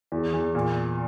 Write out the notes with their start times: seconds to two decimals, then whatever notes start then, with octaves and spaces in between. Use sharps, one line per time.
0.12 E2
0.33 E2
0.55 A#2